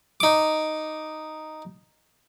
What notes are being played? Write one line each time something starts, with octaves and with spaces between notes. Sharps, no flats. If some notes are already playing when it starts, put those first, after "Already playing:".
D#4 D6